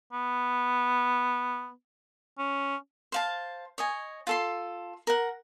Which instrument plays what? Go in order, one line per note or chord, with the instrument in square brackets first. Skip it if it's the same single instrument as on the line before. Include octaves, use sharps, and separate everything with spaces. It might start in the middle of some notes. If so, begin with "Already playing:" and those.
[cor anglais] B3
C#4
[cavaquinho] C5 F5 A5
C#5 D#5 G#5
F4 A4 C6
A#4 F#5